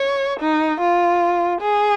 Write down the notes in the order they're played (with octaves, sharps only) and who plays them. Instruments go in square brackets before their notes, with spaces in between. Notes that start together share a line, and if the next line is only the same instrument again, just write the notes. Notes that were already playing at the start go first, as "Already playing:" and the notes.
Already playing: [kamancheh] C#5
D#4
F4
G#4